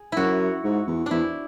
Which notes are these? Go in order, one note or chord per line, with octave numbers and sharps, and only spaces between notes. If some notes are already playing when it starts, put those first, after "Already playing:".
Already playing: G#4
F#2 E4 F#4
G#2
E2
E2 D4 E4